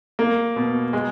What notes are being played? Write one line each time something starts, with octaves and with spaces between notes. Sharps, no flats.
A#3
B2
G#3